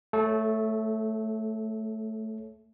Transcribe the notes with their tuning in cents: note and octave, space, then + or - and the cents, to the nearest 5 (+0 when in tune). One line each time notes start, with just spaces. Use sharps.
A3 +0 A4 -25 C#5 +0